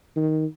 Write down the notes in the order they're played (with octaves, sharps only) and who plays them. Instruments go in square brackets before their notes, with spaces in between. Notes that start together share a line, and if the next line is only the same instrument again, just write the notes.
[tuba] D#3